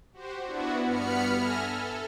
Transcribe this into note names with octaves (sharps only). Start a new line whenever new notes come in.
F#4 G4 C5
B3 D4 E4 F#4
G2 B3 B5 F6 C#7
A4 E5 G#5 F6 A#6
A4